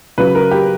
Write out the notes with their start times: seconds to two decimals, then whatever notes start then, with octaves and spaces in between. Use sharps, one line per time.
0.18 C#3 F#3 B4
0.35 A#4
0.51 G4